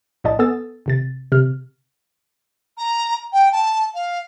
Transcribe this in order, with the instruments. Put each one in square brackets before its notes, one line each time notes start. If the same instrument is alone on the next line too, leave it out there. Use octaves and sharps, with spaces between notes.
[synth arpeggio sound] A#1 A2 D5 D#5 A5 A6
B3 A4 G#5 D#6 E6 A6
G#1 C3 A6
C3 F6
[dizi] A#5
G5
A5
F5